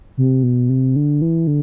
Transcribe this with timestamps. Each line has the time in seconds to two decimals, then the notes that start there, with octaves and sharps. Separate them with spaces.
0.18 C3
0.43 B2
0.69 C3
0.96 D3
1.22 E3
1.47 D3